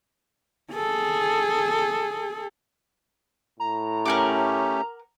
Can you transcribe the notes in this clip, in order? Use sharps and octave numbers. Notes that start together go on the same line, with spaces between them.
G#4 A4
A2 A#5
A3 C#4 G4 A#4 F#5 D6